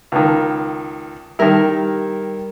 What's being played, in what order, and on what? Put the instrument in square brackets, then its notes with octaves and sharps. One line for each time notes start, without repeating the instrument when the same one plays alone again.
[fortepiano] C#2 D#3
[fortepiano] D#3 E4 [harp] G3 A#4